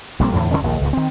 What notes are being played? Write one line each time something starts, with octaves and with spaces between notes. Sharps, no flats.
A#1 G3 A#3 C4
E2 A2 D3 E3
E2 D3 D#3 C#4
A#1 D#2
C#2 G2
D#3 C4